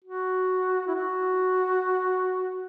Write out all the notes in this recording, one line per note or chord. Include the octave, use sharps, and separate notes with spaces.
F#4
E4
F#4